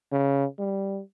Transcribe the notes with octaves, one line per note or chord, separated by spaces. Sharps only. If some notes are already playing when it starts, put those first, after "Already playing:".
C#3
G3